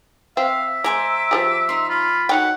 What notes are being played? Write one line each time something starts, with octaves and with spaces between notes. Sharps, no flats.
C4 E5 F5
G#3 C5 G#5 A#5 D6
F3 G3 G#4
D#4 C6
F4 B5
F#3 D#4 A4 C#5 F#5 G5